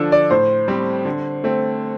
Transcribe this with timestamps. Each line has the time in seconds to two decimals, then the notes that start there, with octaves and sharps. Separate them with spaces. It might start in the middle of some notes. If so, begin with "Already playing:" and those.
Already playing: D3 F3 D4 A4
0.12 D5
0.30 A2 C5
0.68 G3 C4 G4
1.05 D3
1.44 A3 C4